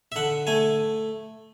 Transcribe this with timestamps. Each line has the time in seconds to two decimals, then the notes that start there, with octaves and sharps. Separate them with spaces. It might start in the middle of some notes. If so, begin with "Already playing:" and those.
0.12 E5
0.16 D3 F#5
0.47 A3 G#5